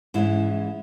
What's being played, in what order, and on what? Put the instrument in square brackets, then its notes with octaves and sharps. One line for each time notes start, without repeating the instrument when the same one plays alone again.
[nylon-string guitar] G#2 E3 G#3 C#4 E4